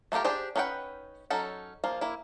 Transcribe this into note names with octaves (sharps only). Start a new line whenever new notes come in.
A3 A#3 F4 G4 A#4
D4 G4 G#4 C5
C#4 D#4 B4 F#5 G5
F#3 C#4 D#4 A4
F3 A#3 F4
A#3 E4